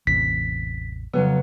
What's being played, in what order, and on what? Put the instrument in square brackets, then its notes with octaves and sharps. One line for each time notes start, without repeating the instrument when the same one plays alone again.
[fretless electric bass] A1 E2 C3 [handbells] B6
[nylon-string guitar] F2 F#3 B3 [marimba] C#3